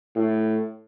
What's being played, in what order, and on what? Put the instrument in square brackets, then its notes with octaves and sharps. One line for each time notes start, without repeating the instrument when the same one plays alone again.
[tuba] A2